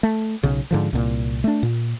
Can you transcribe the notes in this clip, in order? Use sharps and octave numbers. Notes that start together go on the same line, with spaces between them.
A3
B1 C#3
G#2 D3 F3
C2 A#2
A3 D4
A#2